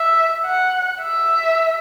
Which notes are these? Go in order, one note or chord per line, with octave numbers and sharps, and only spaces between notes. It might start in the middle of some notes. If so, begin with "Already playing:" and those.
Already playing: E5
F#5
E5